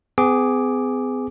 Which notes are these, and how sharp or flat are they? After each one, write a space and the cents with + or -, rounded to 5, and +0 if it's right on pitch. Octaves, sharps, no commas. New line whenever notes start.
B3 +45 G#4 +0 D6 +0